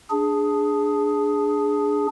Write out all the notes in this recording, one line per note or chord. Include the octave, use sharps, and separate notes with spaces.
D4 G#4